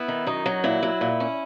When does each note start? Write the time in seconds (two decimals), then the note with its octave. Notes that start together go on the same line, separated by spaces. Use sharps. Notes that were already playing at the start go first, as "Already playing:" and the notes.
Already playing: B3 E4
0.08 D#3
0.27 F#2 D#4
0.46 F#3
0.64 A#2 E4
0.83 F#3
1.01 A#2
1.20 C#4